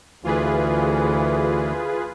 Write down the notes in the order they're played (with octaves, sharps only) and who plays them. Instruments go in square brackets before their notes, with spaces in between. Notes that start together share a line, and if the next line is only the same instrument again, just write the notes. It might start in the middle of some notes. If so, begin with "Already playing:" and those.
[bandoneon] D2 E3 [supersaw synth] F4 G#4 B4